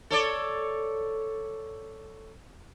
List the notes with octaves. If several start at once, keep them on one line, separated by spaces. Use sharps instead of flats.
A4 C#5 D5